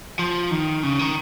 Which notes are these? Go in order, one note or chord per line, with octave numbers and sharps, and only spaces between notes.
F3
D#3
C#3
D#3